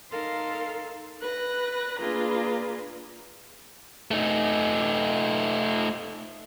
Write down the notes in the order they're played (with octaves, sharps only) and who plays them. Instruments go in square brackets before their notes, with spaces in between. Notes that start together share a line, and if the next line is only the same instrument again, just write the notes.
[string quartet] D#4 A4 A#4 F5 C6
B4 F#6 A#6
A#3 D4 F4 G#4 B4 A#5
[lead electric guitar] A3 D#4